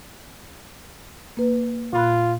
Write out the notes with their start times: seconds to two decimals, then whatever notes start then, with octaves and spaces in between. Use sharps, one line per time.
1.37 A#3 B4
1.93 A#2 F4 B5 F#6